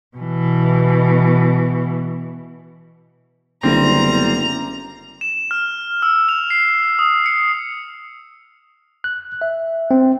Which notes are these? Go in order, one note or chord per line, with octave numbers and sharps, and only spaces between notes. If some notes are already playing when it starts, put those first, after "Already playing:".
B2 E3
F#1 D3 G3 B3 C4 E4 A#5
E7
F6
E6
F7
C7
D#6
C#7
F#6
E5
C4